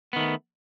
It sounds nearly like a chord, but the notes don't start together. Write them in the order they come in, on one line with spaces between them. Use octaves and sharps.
B3 D#3 A3